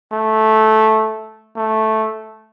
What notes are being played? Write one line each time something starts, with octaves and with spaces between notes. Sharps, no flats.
A3
A3